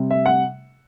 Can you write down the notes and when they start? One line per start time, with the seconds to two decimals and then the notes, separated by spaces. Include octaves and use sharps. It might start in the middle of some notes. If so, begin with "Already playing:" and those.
Already playing: C3 G3
0.11 E5
0.26 F#5